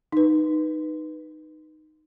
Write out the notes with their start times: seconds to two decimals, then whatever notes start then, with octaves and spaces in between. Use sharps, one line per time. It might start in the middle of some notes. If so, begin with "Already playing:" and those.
0.12 D#4 B4